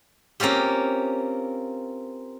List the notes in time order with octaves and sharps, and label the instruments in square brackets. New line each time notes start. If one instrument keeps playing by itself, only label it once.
[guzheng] A#3 C4 C#4 F4 G4